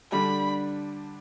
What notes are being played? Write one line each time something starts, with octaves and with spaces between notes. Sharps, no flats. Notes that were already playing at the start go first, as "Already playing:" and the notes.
D3 G3 D4 B5